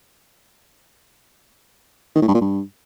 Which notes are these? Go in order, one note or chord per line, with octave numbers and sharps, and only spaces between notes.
D#3
A2
G2
A#2
G2